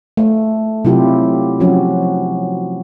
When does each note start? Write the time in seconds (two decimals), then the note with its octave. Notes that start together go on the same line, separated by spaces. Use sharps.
0.17 A3
0.85 C3 F#3 E4 F4 G4
1.60 F3 F#3 C#4 F#4